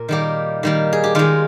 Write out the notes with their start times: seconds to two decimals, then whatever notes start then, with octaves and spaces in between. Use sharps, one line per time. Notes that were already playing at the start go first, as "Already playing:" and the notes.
Already playing: A#2 A#4
0.09 D#3 G3 A#3 G4
0.63 D#3 G3 A#3
0.93 G#4
1.04 G4
1.15 D#3 G#3 F4